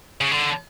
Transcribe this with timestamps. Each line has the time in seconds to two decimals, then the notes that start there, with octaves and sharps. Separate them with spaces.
0.21 C#3
0.32 D3